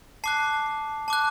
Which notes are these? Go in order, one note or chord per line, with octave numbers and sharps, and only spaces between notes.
A5 D6 F#6 C7
A5 D6 F#6